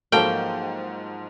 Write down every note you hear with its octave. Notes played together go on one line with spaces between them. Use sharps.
G#2 F3 F#3 A#3 A4 G5 A5